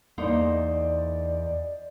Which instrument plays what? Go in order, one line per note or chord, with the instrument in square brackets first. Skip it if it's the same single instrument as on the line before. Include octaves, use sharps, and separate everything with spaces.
[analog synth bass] E2 [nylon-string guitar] A#3 D#4 [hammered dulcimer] C5 D#5 C6 [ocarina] D5